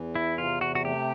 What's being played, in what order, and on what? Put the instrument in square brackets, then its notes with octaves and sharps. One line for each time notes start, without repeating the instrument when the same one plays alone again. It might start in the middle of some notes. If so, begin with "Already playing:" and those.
Already playing: [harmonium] E2 E3
[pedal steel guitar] E4
[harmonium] C3 [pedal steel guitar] F4
[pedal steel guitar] F#4
F#4
[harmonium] A3 [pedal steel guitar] G4